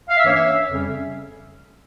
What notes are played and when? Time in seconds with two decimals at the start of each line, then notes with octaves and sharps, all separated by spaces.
0.08 F5
0.17 E5
0.24 G2 E3 A#3 C#4 C#5
0.34 E5
0.69 F2 C#3 G3 C#4